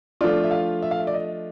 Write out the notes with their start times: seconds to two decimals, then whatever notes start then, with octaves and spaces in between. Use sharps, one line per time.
0.21 F3 A3 D4 F4 D5
0.44 E5
0.51 F5
0.82 E5
0.91 F5
0.99 E5
1.07 D5
1.14 D#5